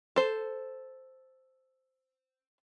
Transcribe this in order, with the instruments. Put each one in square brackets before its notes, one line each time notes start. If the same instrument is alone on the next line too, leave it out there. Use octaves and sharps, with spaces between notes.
[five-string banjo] A4 C5